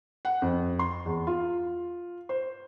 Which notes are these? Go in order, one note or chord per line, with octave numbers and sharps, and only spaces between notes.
F#5
F2
C6
E2
F4
C5